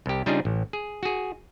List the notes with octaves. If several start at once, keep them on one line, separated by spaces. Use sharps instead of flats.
C2 G4
C#3 G3 D4 D#4 F4 G#4
A1
G#4
F#4 G#4